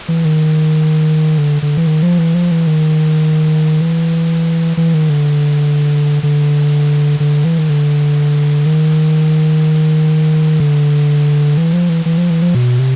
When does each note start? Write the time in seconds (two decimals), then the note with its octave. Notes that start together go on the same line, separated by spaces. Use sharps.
0.08 E3
0.25 D#3
1.38 D3
1.62 D3
1.77 E3
1.87 D#3
2.03 F3
2.18 E3
2.34 F3
2.51 E3
2.67 D#3
3.81 E3
4.77 E3
4.94 D#3
5.09 D3
6.23 D3
7.20 D3
7.45 E3
7.58 D#3
7.69 D3
8.66 D#3
10.60 D3
11.58 E3
11.73 F3
11.89 E3
12.06 E3
12.18 F3
12.30 E3
12.42 F3
12.55 B2
12.79 C3